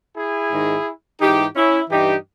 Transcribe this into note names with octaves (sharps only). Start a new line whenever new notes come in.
E4 G#4
G#2 D#3
G#2 E3 D#4 G4
C#4 E4
G2 E3 D#4 G4